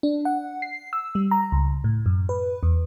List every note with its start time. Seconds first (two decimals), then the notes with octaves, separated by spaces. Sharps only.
0.03 D4
0.25 F#5
0.62 C7
0.93 E6
1.15 G3
1.31 A#5
1.52 C#2
1.84 A2
2.06 F#2
2.29 B4
2.63 E2